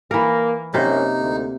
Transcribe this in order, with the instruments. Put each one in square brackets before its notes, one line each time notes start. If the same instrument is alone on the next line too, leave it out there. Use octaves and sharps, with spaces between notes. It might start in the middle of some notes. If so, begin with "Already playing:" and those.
[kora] E3 A#4 [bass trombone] A#3
[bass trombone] F#2 [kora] C3 A#3 [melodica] D#4
[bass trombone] D2